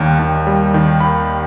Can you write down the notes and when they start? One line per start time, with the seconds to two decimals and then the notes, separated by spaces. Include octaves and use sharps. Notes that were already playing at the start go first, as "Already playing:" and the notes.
Already playing: D#2 D#3 G3
0.19 D#2
0.47 G3
0.74 D#3
1.00 D#2 B5